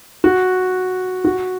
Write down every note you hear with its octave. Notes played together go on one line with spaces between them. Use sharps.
F#4
F#4